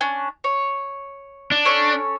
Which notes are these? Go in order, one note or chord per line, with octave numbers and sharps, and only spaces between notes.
C#4 D4
C#5
D4
C#4 A4 C#5